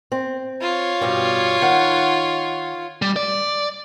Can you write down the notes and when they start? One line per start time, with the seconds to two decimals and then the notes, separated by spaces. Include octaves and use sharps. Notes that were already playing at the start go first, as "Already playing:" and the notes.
0.12 C4
0.62 F4 C#5
1.01 G2 B2 G3
1.62 D#3 F#5
3.02 G3
3.16 D5